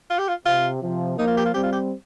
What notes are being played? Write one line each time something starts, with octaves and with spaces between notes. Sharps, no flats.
F4
G4
F4
C3 F4
C3 F3
F3 A#3 D#4
F4
G4
F4
G3 C4 G4
F4
G4